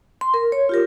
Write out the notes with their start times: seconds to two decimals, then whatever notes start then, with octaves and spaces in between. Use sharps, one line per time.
0.21 C6
0.34 A#4
0.52 C#5
0.69 F4 G4 A#4